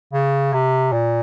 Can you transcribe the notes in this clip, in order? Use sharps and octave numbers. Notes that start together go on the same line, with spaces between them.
C#3
C3
A#2